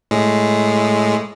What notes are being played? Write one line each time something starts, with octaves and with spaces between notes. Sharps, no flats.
A2 G#3